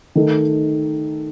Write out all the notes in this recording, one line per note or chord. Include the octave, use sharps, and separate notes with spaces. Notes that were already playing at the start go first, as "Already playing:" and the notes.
D#3 A3 D#4